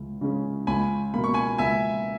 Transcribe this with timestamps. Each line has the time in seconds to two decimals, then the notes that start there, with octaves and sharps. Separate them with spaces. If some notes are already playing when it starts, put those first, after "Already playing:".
Already playing: C#2
0.21 C#3 G#3 C#4
0.67 C#2 G#5 B5
1.14 B2 A#3 B5
1.24 C#6
1.34 G#5 B5
1.58 C#2 E5 G#5